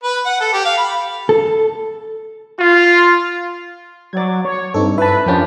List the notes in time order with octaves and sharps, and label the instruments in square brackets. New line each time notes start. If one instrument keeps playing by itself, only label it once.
[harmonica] B4
F#5
A4
G4
F5
B5
[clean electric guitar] A4
[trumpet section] F4
[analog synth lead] F#3 [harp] D5 G#6
[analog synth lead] C#5
[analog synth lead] G2 [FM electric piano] C4 D#4 A4
[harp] E4 B5 [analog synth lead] B4 [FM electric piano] E5 A5
[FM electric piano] F2 C#4 [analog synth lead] F3 [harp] D4 G4 A#4